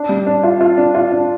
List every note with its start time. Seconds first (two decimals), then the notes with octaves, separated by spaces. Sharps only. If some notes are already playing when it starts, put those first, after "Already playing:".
Already playing: D4
0.09 G3
0.26 D4
0.44 F4
0.61 F4
0.77 D4
0.95 F4
1.12 D4